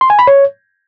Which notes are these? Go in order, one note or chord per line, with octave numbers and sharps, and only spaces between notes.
C6
G#5
B5
C#5